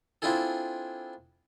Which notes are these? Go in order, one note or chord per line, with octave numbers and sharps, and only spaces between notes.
C4 D4 E4 F4 G#4 A4